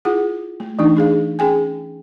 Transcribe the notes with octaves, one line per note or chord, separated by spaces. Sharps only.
E4 F4 G#4 F#5
A3
E3 A3 D4 D#4
D4 G#4 F5
C#4 G#4 G5 G#5